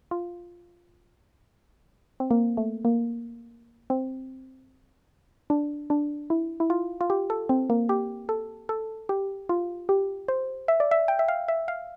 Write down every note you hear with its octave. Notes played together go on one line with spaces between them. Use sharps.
F4
C4
A#3
A3
A#3
C4
D4
D4
E4
E4
F4
F4
G4
A4
C4
A#3
G4
A4
A4
G4
F4
G4
C5
E5
D5
E5
G5
E5
F5
E5
F5